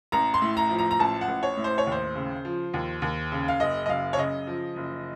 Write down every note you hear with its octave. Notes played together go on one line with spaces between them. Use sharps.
A1 A#5
C6
A2
A#5
F3
A#5
A#5
A1 A5
F#5
A1
C#5
A2
C5
C#5
D#2 C5
C#3
F3
D#2
D#2
C#3
F5
F#1 D#5
D#5
F#2 F5
C#5
C#3 D#5
F3
F#1